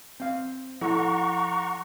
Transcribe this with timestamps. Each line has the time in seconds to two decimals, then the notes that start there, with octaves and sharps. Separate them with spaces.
0.20 C4 F5
0.81 F3 E4 A4 F#5 A#5 C#6